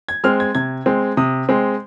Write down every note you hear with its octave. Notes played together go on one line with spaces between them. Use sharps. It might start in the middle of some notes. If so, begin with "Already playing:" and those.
G#6
G#3 C4 F6
G#6
C3 G#6
G#3 C4
C3 D#6
G#3 C4